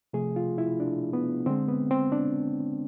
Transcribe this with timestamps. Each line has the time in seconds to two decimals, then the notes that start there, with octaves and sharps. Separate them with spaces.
0.13 C3 F3 A3 G#4
0.36 F4
0.58 E4
0.80 D4
1.13 B3
1.46 D3 G#3 C4
1.69 B3
1.91 C4
2.12 D4